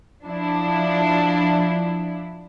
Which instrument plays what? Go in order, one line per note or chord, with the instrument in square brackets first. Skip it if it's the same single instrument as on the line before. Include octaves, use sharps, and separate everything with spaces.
[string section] F3 D4 E4